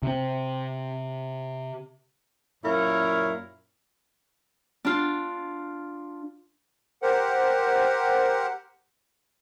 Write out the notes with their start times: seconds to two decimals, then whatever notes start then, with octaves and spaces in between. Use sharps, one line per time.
0.03 C3 C4
2.64 F#2 A#2 E4 A#4 C#5 F5
4.85 D4 F4
7.02 G4 A#4 C5 F#5